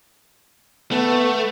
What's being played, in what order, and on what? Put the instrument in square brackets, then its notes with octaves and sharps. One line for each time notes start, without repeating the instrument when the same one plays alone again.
[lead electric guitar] A3 [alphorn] B3